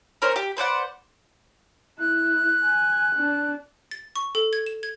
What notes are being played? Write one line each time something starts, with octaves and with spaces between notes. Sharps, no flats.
C#4 A#4 C5 D#5
G4
B4 C5 D5 F#5
E4 F#6
G#5
D4
A6
C#6
A4
G#6
E7
G#6